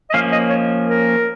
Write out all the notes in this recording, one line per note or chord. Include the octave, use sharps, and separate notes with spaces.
D#5
F3 A#3 C#4 F5
D#5
C#5
A#4